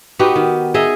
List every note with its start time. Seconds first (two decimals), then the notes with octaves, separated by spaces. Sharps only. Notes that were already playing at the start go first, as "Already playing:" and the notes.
0.19 B3 D#4 F#4 G4
0.36 D#3
0.74 D#4 G#4 D#5 E5